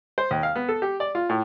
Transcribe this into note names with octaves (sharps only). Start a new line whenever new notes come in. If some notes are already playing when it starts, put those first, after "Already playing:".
C5
D#2
F5
B3
A4
G4
D5
F4
A2